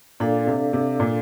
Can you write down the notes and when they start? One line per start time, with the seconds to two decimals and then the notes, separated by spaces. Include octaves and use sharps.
0.20 A#2 D4 A4 D5 F5
0.47 C3
0.73 C3
1.00 A#2